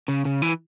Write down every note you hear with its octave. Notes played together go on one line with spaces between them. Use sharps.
C#3
C#3
E3